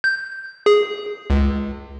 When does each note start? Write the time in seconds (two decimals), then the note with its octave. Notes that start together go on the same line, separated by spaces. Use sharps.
0.04 G6
0.66 G#4
1.30 C#2